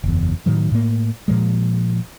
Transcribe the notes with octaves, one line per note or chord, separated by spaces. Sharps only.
F#1 E2
A2 D#3 F#3
A2 A#3
A#2 F3 G#3